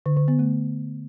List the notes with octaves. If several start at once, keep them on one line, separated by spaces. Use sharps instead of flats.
D3
D3
B3
A3